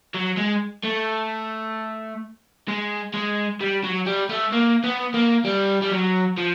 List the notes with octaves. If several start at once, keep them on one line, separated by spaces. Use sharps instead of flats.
F#3
G#3
A3
G#3
G#3
G3
F#3
G3
A3
A#3
B3
A#3
G3
G3
F#3
F3